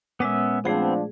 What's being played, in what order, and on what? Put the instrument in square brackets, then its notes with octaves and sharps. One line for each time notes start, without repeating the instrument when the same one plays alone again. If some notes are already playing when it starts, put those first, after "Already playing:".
[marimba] A#2 G#3 [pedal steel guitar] B3 C#4 E5
[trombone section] F3 D4 [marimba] A3 G#4 [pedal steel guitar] B3 C4